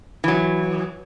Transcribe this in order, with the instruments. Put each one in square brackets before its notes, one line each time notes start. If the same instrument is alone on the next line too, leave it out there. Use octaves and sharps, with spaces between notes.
[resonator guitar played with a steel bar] E3 F#3